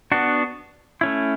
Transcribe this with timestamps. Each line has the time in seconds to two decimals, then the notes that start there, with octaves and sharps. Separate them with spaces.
0.12 B3 D4 F#4
1.01 A3 C#4 E4